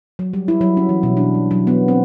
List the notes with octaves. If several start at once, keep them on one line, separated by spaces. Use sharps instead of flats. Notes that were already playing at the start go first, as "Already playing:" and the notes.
F#3
G3
E4
F#3
C#4
E3
B2
D4
G3
F#3
B3
C4